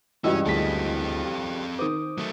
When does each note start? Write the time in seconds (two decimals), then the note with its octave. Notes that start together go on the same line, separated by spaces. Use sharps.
0.24 C#2 G2 E3 G3 C#4 F#4 D#5 E6
0.46 D2 C4 G#4 A4 B6
1.25 G4
1.79 D#3 C5 D6 D#6
2.18 F#3 A3